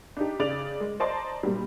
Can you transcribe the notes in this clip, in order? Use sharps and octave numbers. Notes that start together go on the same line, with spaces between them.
D4 D#4 G4
C#3 D5 F7
G#3
C5 D5 D#5 A5 A#5 C6
A#2 F#3 G3